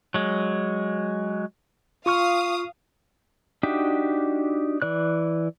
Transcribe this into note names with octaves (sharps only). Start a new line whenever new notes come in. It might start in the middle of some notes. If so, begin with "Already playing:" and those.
F#3 G#3
F4 F5 C#6 D#6 F6
D4 D#4 F#4 G4 E5
E3 D5 F#6